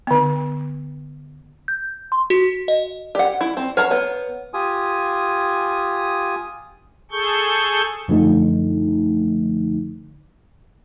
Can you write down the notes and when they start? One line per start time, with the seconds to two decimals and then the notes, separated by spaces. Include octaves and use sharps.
0.07 D3 B3
1.68 G6
2.12 C6
2.30 F#4
2.68 D#5
3.15 G4 D5 F#5
3.41 E4
3.57 C4
3.77 B4 C#5 F#5 A#5
3.91 B3 C#5
4.54 F4 G4 G#5 D#6
7.12 G#4 A4 C#6 G6
8.08 F#2 D3 F3 A3 D#4